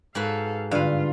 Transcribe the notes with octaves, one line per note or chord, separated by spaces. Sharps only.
G#2 F#4 A4 B4 F5
G2 D3 F4 B4 F5